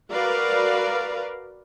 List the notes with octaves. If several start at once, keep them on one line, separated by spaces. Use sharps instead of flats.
F#4 A#4 B4 D5 F5